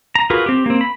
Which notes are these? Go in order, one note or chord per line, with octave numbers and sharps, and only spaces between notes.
A#5
F4 F#4 G#4 A#4 B4
C4 G4
A#3 C4
B5